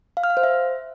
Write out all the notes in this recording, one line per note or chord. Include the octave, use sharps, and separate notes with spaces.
F5
F6
F5
C5
E5